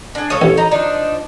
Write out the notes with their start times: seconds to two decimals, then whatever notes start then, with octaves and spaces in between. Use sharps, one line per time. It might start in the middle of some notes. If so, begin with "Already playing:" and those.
0.15 D4 G#4
0.30 A4 C#5 F5 D#6
0.42 A1
0.57 D#4 D#5 A#5
0.71 F3 D4 D#4